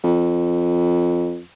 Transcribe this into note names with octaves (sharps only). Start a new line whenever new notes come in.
F2